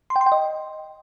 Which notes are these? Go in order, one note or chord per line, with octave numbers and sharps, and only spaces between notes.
C6
G5
C6
G5
D#5